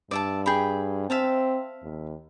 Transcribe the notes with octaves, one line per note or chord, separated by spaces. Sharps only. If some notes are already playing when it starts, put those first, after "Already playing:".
G2 D5 E5 A5
G#4 G5 B5
C4 E5 F5 A5
D#2